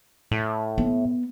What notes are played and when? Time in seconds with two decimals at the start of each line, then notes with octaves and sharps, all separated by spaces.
0.31 A2
0.78 B3